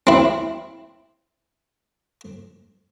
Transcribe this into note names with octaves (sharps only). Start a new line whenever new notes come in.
C4 E4